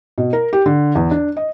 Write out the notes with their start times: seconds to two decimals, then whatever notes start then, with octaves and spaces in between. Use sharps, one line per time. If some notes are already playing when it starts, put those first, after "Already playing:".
0.18 B2
0.33 A#4
0.53 G4
0.66 D3
0.95 E2
1.11 D4
1.37 D#5